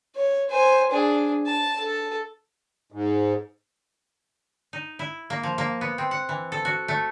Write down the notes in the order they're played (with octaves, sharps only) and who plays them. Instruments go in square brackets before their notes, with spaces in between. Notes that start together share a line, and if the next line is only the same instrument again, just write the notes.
[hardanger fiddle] C#5
C5 G#5
D4 G#4
A5
A4
[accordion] G#2
[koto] D#4
E4
A#3
F3
A#3
B3
C4
F#5
E3
A4
F#4
A3